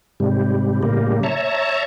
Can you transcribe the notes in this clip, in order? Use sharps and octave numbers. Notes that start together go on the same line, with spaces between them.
G#2 C3 G3
A2 C#3 G3 A#3
C#5 E5 A5 A#5